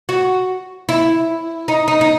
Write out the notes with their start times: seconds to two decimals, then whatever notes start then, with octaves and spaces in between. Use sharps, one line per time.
0.09 F#4
0.89 E4
1.68 D#4
1.88 D#4
2.01 D#4